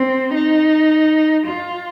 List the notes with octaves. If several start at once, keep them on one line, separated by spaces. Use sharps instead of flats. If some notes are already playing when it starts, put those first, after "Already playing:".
Already playing: C4
D#4
F4